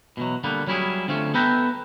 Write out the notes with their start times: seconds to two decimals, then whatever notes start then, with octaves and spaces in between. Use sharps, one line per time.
0.17 B2 E3 F#3
0.44 D3 G3 A#3 B3
0.67 F#3 G3 C#4 E4 F4 G#4
1.08 D3 F3 A3 C4 C#4
1.34 B3 A4 B4 E5 G5 A#5